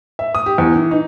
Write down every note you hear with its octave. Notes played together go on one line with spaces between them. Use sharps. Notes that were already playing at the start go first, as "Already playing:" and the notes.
E5
D#6
G4
E2
E3
D#4